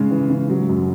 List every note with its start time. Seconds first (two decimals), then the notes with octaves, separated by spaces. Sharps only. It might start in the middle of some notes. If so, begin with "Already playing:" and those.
Already playing: C#3 G#3
0.11 E3
0.30 C#3
0.50 F#3
0.69 F#2